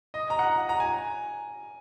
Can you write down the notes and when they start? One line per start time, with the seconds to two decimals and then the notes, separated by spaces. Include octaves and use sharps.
0.14 D#5
0.30 A#5
0.39 F#5
0.69 A#5
0.80 G#5